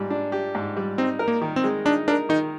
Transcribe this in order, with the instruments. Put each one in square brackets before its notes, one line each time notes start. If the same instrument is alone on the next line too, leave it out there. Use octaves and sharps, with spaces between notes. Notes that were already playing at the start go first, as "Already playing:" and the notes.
Already playing: [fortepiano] G#2 G3
D4
G4
G#2
G3
[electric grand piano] C4 [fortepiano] D#4
[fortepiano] A#4
[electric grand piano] A#3
[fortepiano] D#3
[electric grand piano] C4
[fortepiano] G#3
[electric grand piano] D4 [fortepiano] D#4
[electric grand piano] D4 [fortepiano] A#4
[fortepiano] D#3 [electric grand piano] D#4